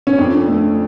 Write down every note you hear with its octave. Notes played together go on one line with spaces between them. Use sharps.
C#4
F2 D4
A3